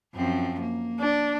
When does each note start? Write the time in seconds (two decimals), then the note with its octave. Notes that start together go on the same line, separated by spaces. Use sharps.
0.14 F#2 F3 C4
0.60 A#3
1.00 D4